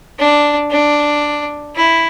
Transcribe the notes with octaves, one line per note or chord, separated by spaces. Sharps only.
D4
D4
E4